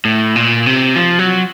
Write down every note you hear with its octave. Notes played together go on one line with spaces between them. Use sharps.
A2
A#2
C3
F3
F#3